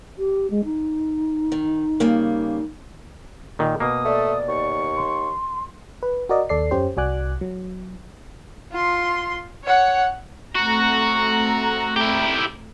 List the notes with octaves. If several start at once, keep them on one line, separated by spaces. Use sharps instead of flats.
G4
G#3
D#4
D#3
C#3 G3 A#3
A#2 D#3
B2 A#3 D#6
A3 D5
D#2 C#6
C6
B4
F#4 A#4 D5 D#5
D#2 A4 D5 C7
F#2 C#4 G4 C5
C2 F#4 D5 G#5 D6 F#6
F#3
F4 C6
C#5 F#5
A3 C4 F#4 A#5
E4 G4